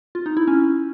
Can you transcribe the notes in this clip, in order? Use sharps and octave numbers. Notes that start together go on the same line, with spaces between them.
F4
D#4
E4
C#4